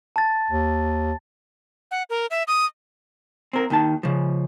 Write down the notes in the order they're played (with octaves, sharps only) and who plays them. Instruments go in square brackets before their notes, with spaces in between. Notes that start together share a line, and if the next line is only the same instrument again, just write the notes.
[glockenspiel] A5 A6
[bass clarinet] D#2
[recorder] F#5
A#4
E5
D#6
[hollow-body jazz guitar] C4 A#4
D#2 D#3 A5
C#3 F3